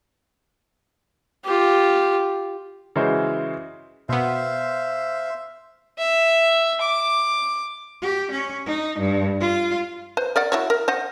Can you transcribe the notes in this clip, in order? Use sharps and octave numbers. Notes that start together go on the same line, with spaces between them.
F4 G4
C#3 E3 G#3 E4 F#4 C5
B2 B3 C5 E5 F5
E5
D6
G4
C#4
D#4
G2
F4
B4 C5
A#4 D5 F#5
E4 F#4 C#5
A#4
C5 D#5 F#5